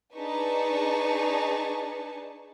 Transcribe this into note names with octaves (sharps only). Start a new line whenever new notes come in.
D4 D#4 G#4 B4 A5 C#6